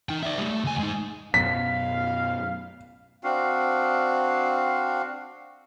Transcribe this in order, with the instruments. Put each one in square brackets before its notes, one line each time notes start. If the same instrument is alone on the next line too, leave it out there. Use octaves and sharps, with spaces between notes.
[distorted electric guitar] D#4 G5
D5 E5
G3 A3
A3
D2 G#5
G#3 D#4
[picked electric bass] F#2 B2 [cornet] F5 [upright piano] B6
[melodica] C4 D4 F#4 F5